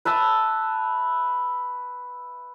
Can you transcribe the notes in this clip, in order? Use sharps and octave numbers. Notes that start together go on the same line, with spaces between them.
B4 E5 A5 E6